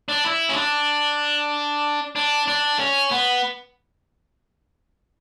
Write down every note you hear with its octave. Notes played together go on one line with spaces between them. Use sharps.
D4
E4
C#4
D4
D4
D4
C#4
B3